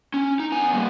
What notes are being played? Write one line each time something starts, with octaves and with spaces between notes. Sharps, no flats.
C#4
D#4
B3 G#5
G3 A#3